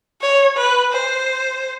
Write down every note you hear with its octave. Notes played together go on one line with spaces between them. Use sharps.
C#5
B4
C5